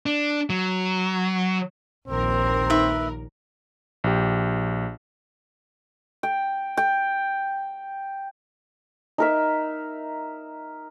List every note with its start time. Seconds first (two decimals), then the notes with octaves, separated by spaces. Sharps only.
0.06 D4
0.50 F#3
2.08 A#1 D#2 C4 A#4
2.70 D#4 B4 E5
4.04 A#1 G4
6.23 G5
6.77 G5
9.18 D#4 A#4 E5